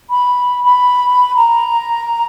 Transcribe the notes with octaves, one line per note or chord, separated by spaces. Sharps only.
B5
B5
A#5